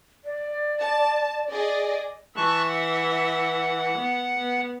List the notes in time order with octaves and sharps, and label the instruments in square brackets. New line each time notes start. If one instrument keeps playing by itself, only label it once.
[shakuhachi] D5
[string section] A5
G#4 D5 D#5
[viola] E3 E5 [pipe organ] A5 C#6 F#6
[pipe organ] F#5
[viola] B3
B3